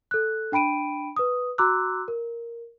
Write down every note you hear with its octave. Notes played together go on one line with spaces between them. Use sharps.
A4 F#6
D4 G5 B5 D7 D#7
B4 D#6
F#4 A#5 C6 D6 E6 F#6
A#4